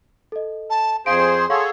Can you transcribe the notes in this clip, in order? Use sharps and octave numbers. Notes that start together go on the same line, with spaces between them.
A4 D#5
A5
F2 G#4 C5 F5 C6 D7
G#4 A4 C#5 F5 F#5 C#6